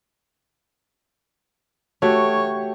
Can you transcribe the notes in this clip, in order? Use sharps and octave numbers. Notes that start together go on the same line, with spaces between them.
A3 F#4 G4 C#5